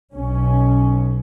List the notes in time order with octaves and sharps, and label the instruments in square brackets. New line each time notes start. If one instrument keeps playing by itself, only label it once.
[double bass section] B1 C#4